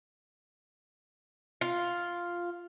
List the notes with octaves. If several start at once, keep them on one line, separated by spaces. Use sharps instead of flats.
F4